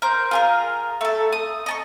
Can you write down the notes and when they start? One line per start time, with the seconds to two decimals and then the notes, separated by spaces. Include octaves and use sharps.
0.02 A#4 C5 G6
0.31 F4 G#4 A#4
1.01 A3 A4
1.32 D#6
1.66 D#5 A5 C#6